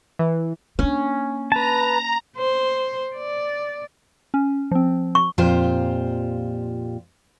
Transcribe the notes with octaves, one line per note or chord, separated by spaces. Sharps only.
E3
A#3 C#4 D4
B4 A5 A#5
C5
D5
C#4
F3 C4
C#6
F2 A#2 F4 G4 C5